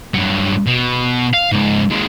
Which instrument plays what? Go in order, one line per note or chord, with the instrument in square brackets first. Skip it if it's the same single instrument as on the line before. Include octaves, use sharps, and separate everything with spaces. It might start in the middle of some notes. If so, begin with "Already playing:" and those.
[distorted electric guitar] G2 F#3
B2
F5
C#2 G#2
D#2 G#3